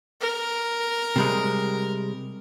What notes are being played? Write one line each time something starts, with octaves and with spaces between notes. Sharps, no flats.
A#4
C3 G3 G#3